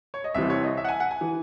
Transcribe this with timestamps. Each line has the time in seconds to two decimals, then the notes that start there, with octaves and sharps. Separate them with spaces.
0.14 C#5
0.24 D#5
0.34 C2 C3 E3 E5
0.50 C#5
0.64 D#5
0.77 E5
0.85 F#5
0.89 G#5
1.00 F#5
1.11 G#5
1.21 E3